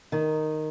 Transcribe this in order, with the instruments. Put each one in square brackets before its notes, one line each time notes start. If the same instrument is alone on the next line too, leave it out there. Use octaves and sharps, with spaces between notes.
[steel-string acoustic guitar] D#3